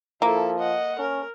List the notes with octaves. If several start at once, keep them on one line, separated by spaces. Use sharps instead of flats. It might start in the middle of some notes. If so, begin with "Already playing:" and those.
F3 A#3 E4 A4
D#5 F#5
C#4 A#4